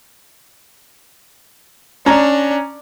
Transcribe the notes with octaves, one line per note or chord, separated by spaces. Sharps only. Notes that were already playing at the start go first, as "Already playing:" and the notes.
C#4 D4 A#5